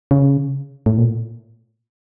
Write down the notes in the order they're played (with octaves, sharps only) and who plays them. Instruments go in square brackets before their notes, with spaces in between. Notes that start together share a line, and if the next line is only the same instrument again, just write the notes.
[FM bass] C#3
A2
A#2